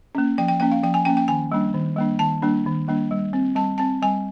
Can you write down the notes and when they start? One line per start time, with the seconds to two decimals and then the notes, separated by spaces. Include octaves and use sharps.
0.15 A#3 C#4
0.38 F3 G5
0.48 G5
0.60 A#3 C#4 G5
0.72 F5
0.83 F3 G5
0.94 G#5
1.05 A#3 C#4 G5
1.17 G5
1.28 D#3 G#5
1.52 G3 A#3 D4
1.74 D#3
1.96 G3 A#3 D4
2.19 D#3 A5
2.42 G3 A#3 D4
2.66 D#3
2.88 G3 A#3 D4
3.11 G3
3.33 C4
3.56 G3 A5
3.78 C4 A5
4.02 G3 G#5